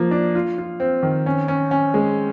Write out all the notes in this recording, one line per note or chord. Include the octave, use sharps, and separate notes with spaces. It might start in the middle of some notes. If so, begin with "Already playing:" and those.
Already playing: F3 A#3
D4
F4
F4
C4
D#3
C#4
C#4
C#4
G#3